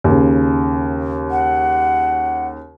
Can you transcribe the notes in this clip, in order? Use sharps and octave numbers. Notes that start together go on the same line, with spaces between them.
D#2 C#3
F#5